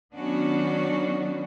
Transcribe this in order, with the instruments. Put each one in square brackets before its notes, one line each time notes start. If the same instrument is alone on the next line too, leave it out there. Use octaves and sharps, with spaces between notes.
[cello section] D#3 F#3 B3 C#4 D4 F#4